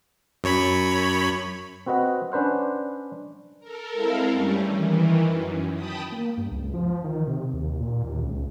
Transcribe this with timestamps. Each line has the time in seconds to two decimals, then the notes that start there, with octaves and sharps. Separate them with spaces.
0.44 F#2 C#5 B5
1.86 C4 F#4 B4 D#5 F#5
2.32 C#4 D4 B4 C5 F#5
3.60 A4 A#4
3.92 G#3 C4 E4 A4 A#4 F5
4.31 G2 G3 A3 C#4
4.67 D#3 E3
5.27 F#2
5.74 G5 A5 B5 D#6
6.12 A#3
6.37 G2
6.51 C#2
6.74 F3
7.04 D#3
7.27 C3
7.53 D#2
7.80 A#2
8.03 D#2
8.22 C#2